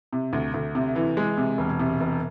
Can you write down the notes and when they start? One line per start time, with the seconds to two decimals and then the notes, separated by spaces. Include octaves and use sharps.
0.13 C3
0.33 D2
0.54 D2
0.75 C3
0.96 E3
1.17 G#3
1.37 C3
1.58 E1
1.79 C3
2.00 E1